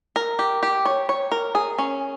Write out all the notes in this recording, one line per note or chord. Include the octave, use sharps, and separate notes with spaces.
A#4
G4
G4
C#5
C#5
A#4
G#4
C#4